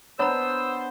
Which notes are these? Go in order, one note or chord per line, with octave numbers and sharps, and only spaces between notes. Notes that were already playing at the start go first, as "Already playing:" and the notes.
B3 D4 C5 C#5 A#5 E6